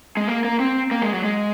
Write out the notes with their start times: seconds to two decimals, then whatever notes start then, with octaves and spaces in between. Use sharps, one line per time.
0.17 G#3
0.28 A#3
0.44 A#3
0.60 C4
0.91 A#3
1.02 G#3
1.14 F#3
1.24 G#3